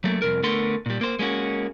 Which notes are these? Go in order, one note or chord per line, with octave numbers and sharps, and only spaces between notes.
F#3 A3 A#3
C2 F2 A#4
D3 A3 B3 A#4 C6
A#2 G3
A#3 C5
G#3 A#3 C#4 F#4